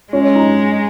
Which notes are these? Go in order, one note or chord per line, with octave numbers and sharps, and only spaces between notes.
G#3 C#4
D#4